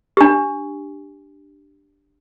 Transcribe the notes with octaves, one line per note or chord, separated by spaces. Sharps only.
D4 G4